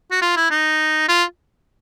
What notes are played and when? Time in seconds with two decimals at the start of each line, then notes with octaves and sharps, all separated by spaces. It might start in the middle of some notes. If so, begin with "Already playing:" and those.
0.11 F#4
0.22 F4
0.36 E4
0.51 D#4
1.09 F4